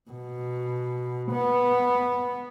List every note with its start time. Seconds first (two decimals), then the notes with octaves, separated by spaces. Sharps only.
0.11 B2
1.31 B3